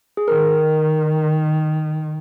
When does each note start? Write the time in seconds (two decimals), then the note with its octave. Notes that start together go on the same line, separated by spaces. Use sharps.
0.17 G#4
0.28 D#3 A#4